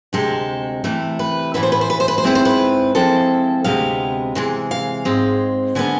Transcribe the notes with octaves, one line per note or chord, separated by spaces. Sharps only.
D2 C3 G#3 A4
C3 E3 A3
B4
A2 E3 B3 E4 B4
C5
B4
C5
B4
C5
B4
C5
G#2 G#3 C4 E4 B4
C5
B4
C3 F3 G#3 C4 E4 A4
D2 C3 G#3 B3 F5
C3 E3 G#3
F5
G#2 G#3 C4
D3 G#3 B3 D4 G#5